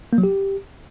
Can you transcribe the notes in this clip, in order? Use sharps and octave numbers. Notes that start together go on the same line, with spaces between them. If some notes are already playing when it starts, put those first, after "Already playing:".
A#3
F#3
G4